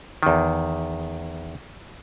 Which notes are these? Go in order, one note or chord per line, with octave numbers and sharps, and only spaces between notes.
E2 D#3